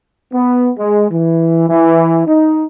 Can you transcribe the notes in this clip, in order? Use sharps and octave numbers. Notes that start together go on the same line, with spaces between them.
B3
G#3
E3
E3
D#4